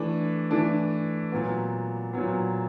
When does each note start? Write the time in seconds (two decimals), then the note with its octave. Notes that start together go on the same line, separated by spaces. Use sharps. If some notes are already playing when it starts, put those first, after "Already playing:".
Already playing: E3 A3 D4
0.51 E3 A3 D4
1.32 A#2 F#3 B3
2.13 A#2 F#3 B3